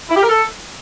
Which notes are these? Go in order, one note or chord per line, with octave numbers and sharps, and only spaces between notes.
E4
G4
A#4
A4